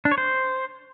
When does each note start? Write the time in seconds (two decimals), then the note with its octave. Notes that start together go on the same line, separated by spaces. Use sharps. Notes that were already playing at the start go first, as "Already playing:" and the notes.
0.05 D4
0.11 C#5
0.18 C5